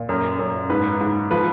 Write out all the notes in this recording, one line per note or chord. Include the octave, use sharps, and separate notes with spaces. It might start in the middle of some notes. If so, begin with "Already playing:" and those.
Already playing: A#2
F#2 A#4
F#2
G#2 B4
G#2
F3 B4